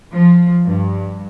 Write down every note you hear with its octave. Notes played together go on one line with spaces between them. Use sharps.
F3
G2